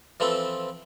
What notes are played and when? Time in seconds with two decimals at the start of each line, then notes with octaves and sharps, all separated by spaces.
0.20 E3 F3 C4 A4 B4